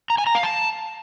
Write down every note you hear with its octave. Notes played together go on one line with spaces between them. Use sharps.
A#5
G#5
A#5
F5
A5